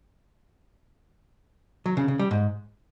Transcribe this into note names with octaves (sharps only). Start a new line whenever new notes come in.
F#3
C#3
C#3
G3
G#2